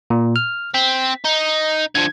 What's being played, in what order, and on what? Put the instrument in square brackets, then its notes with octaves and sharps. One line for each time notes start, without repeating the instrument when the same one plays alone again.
[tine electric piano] A#2
F6
[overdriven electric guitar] C4 [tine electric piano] B6
[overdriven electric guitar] D#4
[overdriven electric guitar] D3 F3 [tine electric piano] G#6